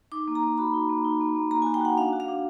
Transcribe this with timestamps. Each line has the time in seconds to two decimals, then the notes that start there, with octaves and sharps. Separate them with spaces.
0.12 D#4 D6
0.28 A#3
0.35 A#5
0.43 A#3
0.58 F#4 B5
0.74 D#4
0.89 A#3
1.05 D#4
1.20 A#3
1.35 A#3
1.51 A#3 A#5
1.62 F#4 G#5
1.74 G5
1.81 F#4 F#5
1.97 D4 F5
2.13 F#4
2.20 F5
2.28 D4